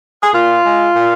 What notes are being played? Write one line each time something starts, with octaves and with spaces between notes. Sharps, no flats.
G#4
A#2 F4
G#3
A#2